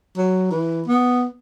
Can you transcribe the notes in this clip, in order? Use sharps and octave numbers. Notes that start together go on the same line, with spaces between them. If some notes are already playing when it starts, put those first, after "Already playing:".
F#3
E3
B3